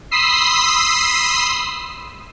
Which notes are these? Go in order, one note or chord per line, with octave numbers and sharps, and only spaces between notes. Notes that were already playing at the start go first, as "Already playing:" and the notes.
B5 C6 D#6 E6 B6 C7